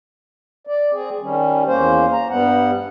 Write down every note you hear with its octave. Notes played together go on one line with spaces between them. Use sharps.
D5
C4 G#4
D#3 G3 C#4
E2 A#3 C#4 C5
A#5
G2 G3 B3 F#5